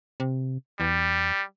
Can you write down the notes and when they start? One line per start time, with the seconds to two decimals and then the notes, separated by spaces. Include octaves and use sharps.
0.20 C3
0.80 E2 G3